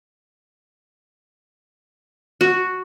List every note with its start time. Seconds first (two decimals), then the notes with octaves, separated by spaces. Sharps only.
2.41 F#4